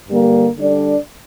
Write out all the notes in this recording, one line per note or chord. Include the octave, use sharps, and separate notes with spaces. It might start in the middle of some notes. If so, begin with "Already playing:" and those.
G2 D3 G3 A#3
D3 G3 D4 A4 D5